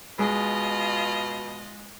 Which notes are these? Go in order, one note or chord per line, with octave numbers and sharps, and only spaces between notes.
B2 G#3 F4 D#5